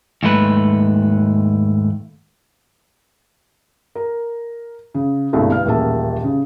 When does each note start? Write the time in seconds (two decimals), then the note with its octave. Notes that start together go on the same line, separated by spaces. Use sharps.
0.23 D#2 G#2 A3 B4
3.95 A#4
4.94 C#3
5.33 C2 G2 B2 D3 G#3 A3
5.52 B4 F5 F6
5.65 D#1 A1 A#3 G#4 E5 A5
6.24 C#3